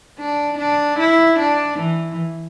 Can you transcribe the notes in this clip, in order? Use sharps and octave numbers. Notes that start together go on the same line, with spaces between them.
D4
D4
E4
D4
E3